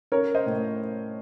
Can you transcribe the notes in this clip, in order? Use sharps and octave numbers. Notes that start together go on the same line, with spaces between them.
C#4 A#4 C#5
C5 D#5
A2